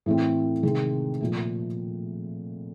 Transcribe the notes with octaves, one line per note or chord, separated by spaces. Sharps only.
A2 E3 A3 C4
C3 D#3 G#3 C4
A#2 F3 A3